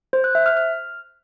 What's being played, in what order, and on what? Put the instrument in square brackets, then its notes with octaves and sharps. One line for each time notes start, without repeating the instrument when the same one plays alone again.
[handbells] C5
F#6
E5
F6
F6